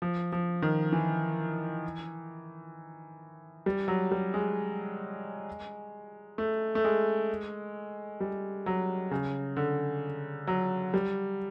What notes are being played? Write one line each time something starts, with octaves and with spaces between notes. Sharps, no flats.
F3
F3
D#3
E3
G3
F#3
G3
G#3
A3
A3
G#3
G3
F#3
C#3
D3
F#3
G3